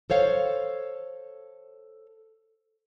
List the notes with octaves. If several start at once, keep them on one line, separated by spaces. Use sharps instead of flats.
A4 C5 C#5 F5